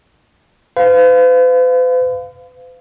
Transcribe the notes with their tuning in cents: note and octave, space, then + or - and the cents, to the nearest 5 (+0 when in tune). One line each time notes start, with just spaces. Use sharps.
B4 +45 F5 +0